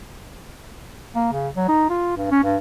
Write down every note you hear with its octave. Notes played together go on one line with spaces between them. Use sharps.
A#3
C#3
F#3
D#4
F4
G2
C#4
G2